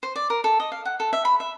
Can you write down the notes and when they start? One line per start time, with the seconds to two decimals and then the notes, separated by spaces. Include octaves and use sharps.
0.03 C5
0.16 D5
0.30 A#4
0.44 A4
0.60 D#5
0.72 F5
0.85 F#5
1.00 A4
1.13 E5
1.25 B5
1.40 E5